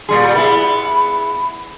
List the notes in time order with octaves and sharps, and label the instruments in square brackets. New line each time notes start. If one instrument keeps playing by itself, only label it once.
[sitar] A#2 G3 G#4 [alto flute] C6
[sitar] B3 E4 G#4 [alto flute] B5